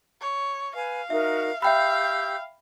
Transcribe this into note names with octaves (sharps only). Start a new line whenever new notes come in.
C#5
B4 F5 G#5
D#4 F#4 A#4 E5
G4 E5 F5 G5 B5 E6 G6